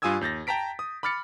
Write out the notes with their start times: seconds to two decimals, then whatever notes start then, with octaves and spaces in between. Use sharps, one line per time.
0.02 G2 F4 G#5 D#6 E6 G#6
0.21 D#2 G6 A6 A#6
0.47 G5 A5 A#5 B6 D7
0.79 D#6
1.03 B5 D6 F6 A6 C#7